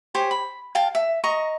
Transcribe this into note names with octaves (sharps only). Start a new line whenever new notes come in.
G4 C5 C#5 G#5
B5
F5 G5 A5
E5
D#5 A#5 C#6